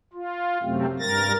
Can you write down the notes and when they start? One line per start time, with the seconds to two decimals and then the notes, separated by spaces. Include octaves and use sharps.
0.13 F4
0.63 F#2 C3 A3 C4
0.99 G2 A#4 A6 A#6